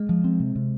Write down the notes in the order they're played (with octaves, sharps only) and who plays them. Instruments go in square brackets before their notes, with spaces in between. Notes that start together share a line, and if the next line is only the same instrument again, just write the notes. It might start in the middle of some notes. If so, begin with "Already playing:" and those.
Already playing: [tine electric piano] G#3
[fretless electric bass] F3
C4
C3
C3